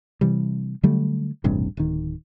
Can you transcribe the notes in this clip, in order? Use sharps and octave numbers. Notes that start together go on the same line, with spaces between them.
C3 E3 G3
D3 F#3 G3 A3
E1 A1 G2 C3
D1 D#3